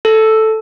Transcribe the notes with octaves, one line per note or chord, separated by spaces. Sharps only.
A4